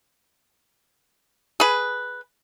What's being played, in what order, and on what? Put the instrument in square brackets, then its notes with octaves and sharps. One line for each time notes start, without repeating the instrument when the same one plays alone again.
[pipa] G#4 B4